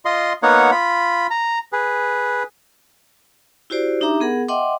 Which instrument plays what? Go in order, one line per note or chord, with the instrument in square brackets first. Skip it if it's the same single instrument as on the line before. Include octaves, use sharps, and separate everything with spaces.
[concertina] F4 D#5 C6
A#3 B3 D#4 C#5 F#5
F4 B5
A#5
G#4 B4
[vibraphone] E4 F#4 G4 C5 D5
D4 D#4 G4 E5 A#5 D6
B3 G#4 A#4 F#5
D#5 E5 F#5 G5 C6 D6